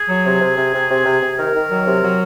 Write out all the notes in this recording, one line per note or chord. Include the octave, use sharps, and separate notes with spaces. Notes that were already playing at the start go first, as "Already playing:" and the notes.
Already playing: G#4
F#3
C3
C3
C3
C3
C3
C3
C3
D#3 A#4
D#3
F#3
C3
F#3